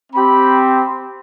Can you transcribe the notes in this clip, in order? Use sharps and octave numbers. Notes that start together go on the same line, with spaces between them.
C4 G4 B5